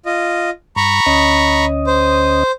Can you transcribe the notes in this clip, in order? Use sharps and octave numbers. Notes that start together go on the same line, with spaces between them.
F4 D#5
G2 A#5 B5 C#6
D2 C#4 D#5
C5